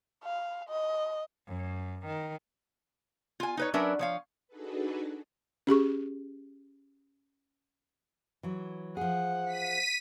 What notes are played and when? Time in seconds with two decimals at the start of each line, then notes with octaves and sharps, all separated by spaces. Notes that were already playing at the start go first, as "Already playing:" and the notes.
0.24 F5
0.69 D#5
1.48 F#2
2.06 D#3
3.40 F4 G#5
3.57 D#4 B4 C#5
3.74 F#3 C#4 D4 A#4 B4 E5
3.99 F3 C#5 F5
4.48 D4 D#4 F#4 G#4 A4 B4
5.67 C#4 G4 G#4 C#6
8.43 E3 F#3
8.97 F3 G#4 F#5
9.46 B6 D#7